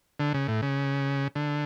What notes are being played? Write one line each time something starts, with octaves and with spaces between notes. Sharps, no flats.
D3
C#3
A2
C#3
D3